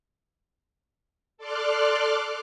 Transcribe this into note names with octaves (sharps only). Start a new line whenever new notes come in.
A4 D5 C6 D6 F6 F#6